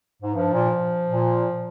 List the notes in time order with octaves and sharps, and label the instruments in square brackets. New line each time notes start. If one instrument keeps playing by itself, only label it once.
[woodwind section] G#2
[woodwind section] G2 [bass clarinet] F3
[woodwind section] A#2
A#2